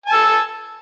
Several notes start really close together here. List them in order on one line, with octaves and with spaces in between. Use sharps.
G#5 A5 E6